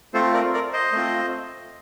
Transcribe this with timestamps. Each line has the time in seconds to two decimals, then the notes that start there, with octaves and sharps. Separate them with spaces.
0.14 A3 C4 F4 A4 C5
0.33 A#4 D5
0.53 A#4 D5
0.73 C5 D#5
0.93 A3 C4 F4